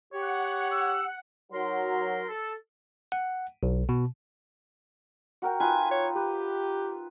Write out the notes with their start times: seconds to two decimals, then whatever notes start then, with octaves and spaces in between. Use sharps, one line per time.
0.13 G4 C#5 F#5
0.71 E6
1.52 F#3 D#4 A#4 C6
2.28 A4
3.12 F#5
3.63 B1
3.89 B2
5.42 F#4 A#4 G5
5.60 D#4 F4 B4 G#5
5.91 C#5
6.16 G4 B4